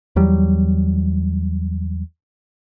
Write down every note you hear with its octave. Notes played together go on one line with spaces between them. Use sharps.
E2 F#3 G3